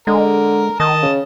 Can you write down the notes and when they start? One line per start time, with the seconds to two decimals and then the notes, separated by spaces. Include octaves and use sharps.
0.07 D3 G#3 A#4
0.80 D#3 D#5 A5
1.02 C#3